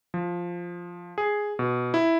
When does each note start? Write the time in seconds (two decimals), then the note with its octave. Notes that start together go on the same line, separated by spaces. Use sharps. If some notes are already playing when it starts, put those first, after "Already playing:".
0.14 F3
1.18 G#4
1.59 B2
1.94 E4